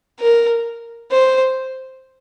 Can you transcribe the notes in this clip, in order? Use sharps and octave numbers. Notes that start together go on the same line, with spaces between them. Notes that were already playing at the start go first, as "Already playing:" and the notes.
A#4
C5